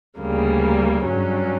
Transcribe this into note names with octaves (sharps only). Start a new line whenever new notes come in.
D2 C#3 G3 A#3
G2 F#3 C#4